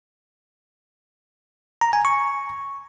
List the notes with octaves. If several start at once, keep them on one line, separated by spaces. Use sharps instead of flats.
A#5
G#5
C#6